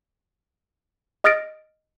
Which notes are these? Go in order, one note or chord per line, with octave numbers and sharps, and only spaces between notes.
D#5 D#6 F6 A6 A#6 D7